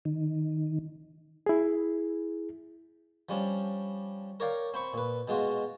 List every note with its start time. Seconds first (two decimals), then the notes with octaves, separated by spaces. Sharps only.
0.05 D#3
1.46 E4 G#4
3.29 F3 G3 C#4 D4
4.40 A#4 C#5 D5 F5 G5 A#5
4.74 C4 G5 B5 C#6
4.93 A#2 B4
5.28 B2 G#3 F4 F#4